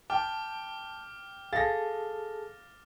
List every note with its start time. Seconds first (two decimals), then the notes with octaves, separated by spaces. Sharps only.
0.10 G5 A5 D6 F6
1.53 G#4 A4 F5 A5 A6 A#6